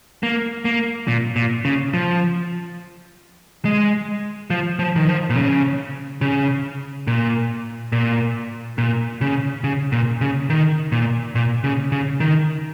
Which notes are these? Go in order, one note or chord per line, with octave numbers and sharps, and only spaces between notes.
A#3
A#3
A#2
A#2
C#3
F3
G#3
F3
F3
D#3
F3
A#2
C#3
C#3
A#2
A#2
A#2
C#3
C#3
A#2
C#3
D#3
A#2
A#2
C#3
C#3
D#3